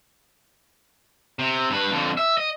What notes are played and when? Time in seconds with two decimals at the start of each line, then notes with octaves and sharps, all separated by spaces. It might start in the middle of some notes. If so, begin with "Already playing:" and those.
1.39 C3
1.70 G2 B4
1.92 F2 D3
2.17 E5
2.38 D#5